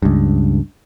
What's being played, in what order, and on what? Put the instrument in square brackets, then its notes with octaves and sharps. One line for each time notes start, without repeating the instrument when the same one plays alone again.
[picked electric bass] C#2 G2